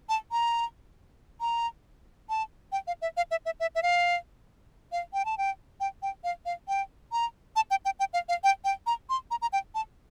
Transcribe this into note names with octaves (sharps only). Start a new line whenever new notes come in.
A5
A#5
A#5
A5
G5
F5
E5
F5
E5
E5
E5
E5
F5
F5
G5
A5
G5
G5
G5
F5
F5
G5
A#5
A5
G5
G5
G5
F5
F5
G5
G5
A#5
C6
A#5
A#5
G5
A5